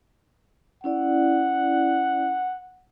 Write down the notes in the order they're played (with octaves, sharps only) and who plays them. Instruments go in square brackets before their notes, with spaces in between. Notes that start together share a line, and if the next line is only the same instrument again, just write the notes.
[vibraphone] C#4 E4 D5 [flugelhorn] F#5